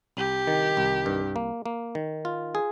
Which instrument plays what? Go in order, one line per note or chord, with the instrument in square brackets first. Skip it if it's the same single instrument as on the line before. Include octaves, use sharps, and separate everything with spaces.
[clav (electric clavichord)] C2 [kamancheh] G4
[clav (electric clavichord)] D#3
C2
G2
A#3
A#3
D#3
F4
G#4